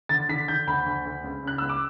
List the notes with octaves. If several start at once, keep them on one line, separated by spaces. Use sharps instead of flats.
D3 A6
D3 B6
D3 G6
D2 B5
D2
D2
C#2
C#3 F#6
C#2 E6
D6